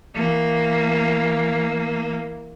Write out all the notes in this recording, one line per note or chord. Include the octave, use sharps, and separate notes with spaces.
E3 A#3